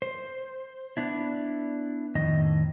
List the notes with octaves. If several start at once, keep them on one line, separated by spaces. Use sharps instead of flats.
C5
B3 D4 E4
F2 A2 D#3 D#5